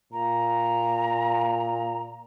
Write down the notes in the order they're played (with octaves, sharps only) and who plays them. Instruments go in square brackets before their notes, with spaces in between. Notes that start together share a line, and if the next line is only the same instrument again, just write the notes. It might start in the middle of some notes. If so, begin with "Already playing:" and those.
[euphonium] A#2 [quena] A#5